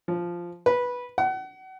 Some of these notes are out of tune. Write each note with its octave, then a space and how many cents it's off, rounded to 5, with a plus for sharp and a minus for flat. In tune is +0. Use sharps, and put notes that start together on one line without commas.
F3 -5
B4 -10
F#5 +35